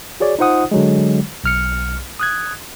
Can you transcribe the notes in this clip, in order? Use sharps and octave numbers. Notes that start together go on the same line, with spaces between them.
F#4 G#4 C#5 D5
D#4 F4 C5 F#5 D#6
D3 F#3 G#3
B1 F6 C#7
D#6 F#6 G#6